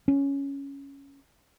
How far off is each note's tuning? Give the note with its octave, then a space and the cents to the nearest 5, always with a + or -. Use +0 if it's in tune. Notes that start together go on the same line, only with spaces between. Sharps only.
C#4 +5